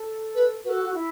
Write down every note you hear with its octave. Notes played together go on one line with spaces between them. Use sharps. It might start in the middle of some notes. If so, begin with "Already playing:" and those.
Already playing: A4
B4
F#4 B4
A4
F#4
E4